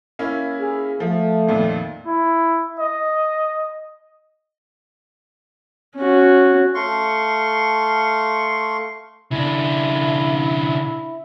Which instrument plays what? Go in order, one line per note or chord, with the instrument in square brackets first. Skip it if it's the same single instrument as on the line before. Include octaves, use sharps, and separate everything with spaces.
[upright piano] A#3 C#4 E4
[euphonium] G#4
[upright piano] F3 [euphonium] A3
[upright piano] F2 A#2 D#3
[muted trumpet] E4
D#5
[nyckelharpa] C#4 F#4
[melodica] A3 F5 C6 C#6
[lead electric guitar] C#3 D4 [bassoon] E4